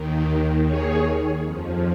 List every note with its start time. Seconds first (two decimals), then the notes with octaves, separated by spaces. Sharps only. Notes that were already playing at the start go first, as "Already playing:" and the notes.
Already playing: D#2 D#3
0.66 G#4 C#5
1.44 F2 F3